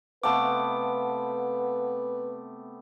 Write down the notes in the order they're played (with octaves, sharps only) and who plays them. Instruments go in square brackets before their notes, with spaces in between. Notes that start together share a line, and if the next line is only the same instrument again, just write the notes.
[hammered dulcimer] C3 A3 B3 [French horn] B4 [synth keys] F5 F#5 A5 [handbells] D6